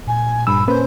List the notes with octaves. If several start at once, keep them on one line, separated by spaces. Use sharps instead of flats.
A#2 G#5
G2 B5 E6
A#3 C#4 B4 C5